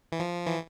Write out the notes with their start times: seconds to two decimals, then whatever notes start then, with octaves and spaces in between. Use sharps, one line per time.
0.12 E3
0.20 F3
0.47 E3